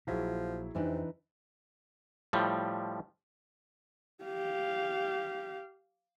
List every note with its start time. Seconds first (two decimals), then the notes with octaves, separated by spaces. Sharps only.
0.07 A#1 A#2 F3 F#3 E4 G#4
0.75 F2 C3 E3 D4 D#4
2.33 A2 F3 G3
4.24 G4 F5